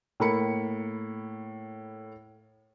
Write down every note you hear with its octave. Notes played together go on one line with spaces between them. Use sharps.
A2 A#3 B5 C#7